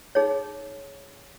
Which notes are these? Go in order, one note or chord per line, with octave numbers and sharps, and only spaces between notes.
D#4 G#4 C#5